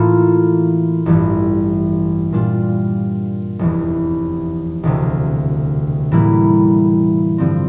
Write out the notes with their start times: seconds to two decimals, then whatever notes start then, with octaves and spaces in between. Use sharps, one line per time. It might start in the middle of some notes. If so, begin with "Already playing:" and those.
Already playing: A2 E3 A#3 F4 A4
1.06 A1 G2 E3 A3
2.32 A#2 G3 D4 F4
3.59 F1 E2 E3
4.83 E1 D2 C3
6.12 A2 E3 G3 A#3 E4
7.38 G2 D3 F3 C4